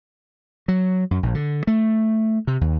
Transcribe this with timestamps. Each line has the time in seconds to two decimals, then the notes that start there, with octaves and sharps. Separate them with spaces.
0.68 F#3
1.11 F#2
1.23 A#1
1.34 D3
1.67 A3
2.47 C3
2.61 D#2